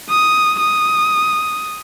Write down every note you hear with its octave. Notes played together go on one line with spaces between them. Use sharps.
D#6
D#6